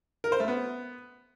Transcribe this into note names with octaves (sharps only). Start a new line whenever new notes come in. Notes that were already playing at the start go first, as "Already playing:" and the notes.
A#4
C5
A3
B3